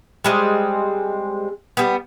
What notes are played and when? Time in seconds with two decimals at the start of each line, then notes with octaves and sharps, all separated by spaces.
0.24 G3 G#3 C4
1.77 G3 B3